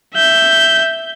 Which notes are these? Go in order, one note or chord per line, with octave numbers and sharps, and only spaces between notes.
E5 G6